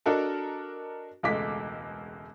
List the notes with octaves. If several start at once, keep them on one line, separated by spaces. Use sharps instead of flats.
D4 F#4 A4 A#4 D#5 A5
E1 C#2 G#3 A3 D6 B6